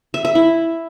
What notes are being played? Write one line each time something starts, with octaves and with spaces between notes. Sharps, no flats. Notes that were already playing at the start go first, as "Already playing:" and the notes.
E5
E5
E4